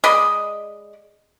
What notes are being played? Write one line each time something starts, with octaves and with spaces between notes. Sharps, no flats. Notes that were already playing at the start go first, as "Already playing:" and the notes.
G#3 D5 D#5 B5